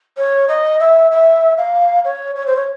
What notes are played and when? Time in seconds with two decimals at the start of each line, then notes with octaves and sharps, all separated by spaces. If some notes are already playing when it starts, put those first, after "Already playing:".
0.17 C#5
0.48 D#5
0.80 E5
1.11 E5
1.57 F5
2.04 C#5
2.35 C#5
2.46 C5
2.56 C#5